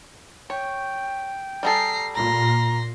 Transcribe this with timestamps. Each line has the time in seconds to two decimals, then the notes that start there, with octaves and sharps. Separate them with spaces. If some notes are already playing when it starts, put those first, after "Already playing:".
0.50 C#5 G5
1.63 G3 G#4 A4 A#5 C7
2.15 A#2 A#5 C6 A#6